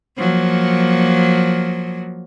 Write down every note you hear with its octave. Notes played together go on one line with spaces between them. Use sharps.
F3 F#3 A#3